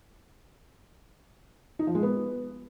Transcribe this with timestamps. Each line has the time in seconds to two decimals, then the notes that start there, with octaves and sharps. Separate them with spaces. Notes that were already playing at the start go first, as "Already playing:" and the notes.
1.79 D#4
1.87 F3
1.95 G#3
2.03 B3